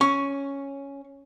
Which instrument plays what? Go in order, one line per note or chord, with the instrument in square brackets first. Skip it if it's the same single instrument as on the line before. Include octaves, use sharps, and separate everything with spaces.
[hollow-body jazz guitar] C#4 [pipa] C#6